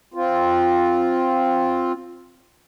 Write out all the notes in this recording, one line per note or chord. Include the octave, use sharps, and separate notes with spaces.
C4 F4